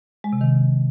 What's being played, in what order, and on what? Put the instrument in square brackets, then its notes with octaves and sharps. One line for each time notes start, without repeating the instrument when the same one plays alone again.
[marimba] G#3
C3
D#3